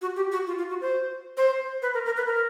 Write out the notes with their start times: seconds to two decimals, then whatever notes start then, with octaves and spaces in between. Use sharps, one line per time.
0.02 F#4
0.16 G4
0.32 F#4
0.47 F4
0.58 F4
0.69 F#4
0.81 C5
1.37 C5
1.82 B4
1.94 A#4
2.05 A#4
2.16 B4
2.27 A#4